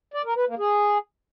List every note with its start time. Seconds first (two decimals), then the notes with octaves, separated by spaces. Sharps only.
0.14 D5
0.25 A#4
0.36 B4
0.47 A#3
0.59 G#4